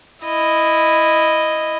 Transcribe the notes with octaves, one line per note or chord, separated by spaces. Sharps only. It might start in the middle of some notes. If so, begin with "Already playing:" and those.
E4 D#5